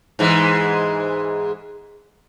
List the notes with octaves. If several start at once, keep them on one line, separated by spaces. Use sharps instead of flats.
G#2 E3 G#3